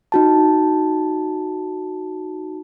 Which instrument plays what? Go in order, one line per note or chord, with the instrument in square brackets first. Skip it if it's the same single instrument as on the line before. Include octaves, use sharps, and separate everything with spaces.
[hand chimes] D#4 F#4 A5